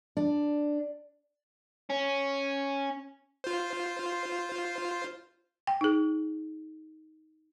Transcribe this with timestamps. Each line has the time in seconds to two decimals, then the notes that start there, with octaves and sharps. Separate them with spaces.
0.17 D4
1.90 C#4
3.44 F4 C5
5.67 G5
5.81 D#4 G#4